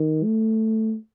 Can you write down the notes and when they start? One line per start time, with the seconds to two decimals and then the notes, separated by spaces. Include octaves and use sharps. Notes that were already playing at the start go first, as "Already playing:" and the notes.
Already playing: D#3
0.24 A3